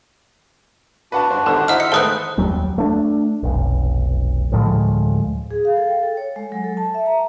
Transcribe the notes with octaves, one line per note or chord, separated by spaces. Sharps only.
D4 F#4 B4 F#5 A5
G2 C5
G1 D3 D#3 C5 F#5 E7
D#4 E4 C5 D#5 F#5 F6
E5 C#7
G#2 D#3 A3 B4 C5 G5 D#6 F#6
D#2 F#3 G3
A3 D4
F1 B1
D2 A2 F3 G#3
G#4
F5
A4
G5
A4
C#5
G#3
F#3
A4
A5
E5
A#5